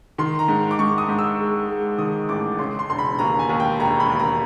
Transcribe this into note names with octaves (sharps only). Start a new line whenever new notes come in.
D#3 C6
A#5
G#2
D6
G#2 C#6
D#6
G#2
E6
G#3
G#3
D#3 D#6
A1 D6
C#3 C6
C6
E1 C6
B5
D#2 A#5
G#5
D#2
G5
E1 A#5
B5
D#2
A#5